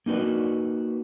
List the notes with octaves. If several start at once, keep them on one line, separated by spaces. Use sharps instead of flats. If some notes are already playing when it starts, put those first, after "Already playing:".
A#3 D#4 F#4 B4 D5